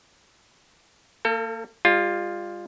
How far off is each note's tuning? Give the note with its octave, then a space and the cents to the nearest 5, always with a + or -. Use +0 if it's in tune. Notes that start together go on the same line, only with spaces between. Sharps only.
A#3 -30 A4 +30
G3 +35 F4 +0